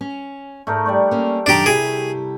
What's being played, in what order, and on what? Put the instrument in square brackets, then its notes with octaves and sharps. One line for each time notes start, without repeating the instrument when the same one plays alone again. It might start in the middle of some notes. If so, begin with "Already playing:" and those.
[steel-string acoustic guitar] C#4
[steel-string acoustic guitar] G#2 [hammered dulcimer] A3 D#4 A#4
[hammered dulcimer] G3 D5 C#6
[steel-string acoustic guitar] A#3 C#4
[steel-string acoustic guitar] F#2 D#3 A#5 [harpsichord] D4 G4
[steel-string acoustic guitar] C3 E4 G4 [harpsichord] G#4